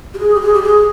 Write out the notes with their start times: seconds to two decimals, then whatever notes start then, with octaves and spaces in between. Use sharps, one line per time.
0.14 G4
0.19 G#4
0.35 G4
0.41 G#4
0.54 G4
0.63 G#4